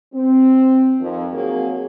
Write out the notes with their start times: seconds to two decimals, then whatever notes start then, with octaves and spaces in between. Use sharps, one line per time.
0.14 C4
1.00 F2 D#3
1.33 F#3 A#3 C4 G#4